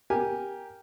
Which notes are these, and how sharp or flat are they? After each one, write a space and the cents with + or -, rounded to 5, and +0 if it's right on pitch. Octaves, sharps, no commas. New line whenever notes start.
G4 +0 A#4 +0 G#5 -5